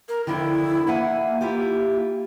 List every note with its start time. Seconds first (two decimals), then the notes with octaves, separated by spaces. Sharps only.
0.09 A#4
0.27 F2 D3 D#3 E4
0.87 A#3 E5 F#5 G#5
1.41 E4 F4 G4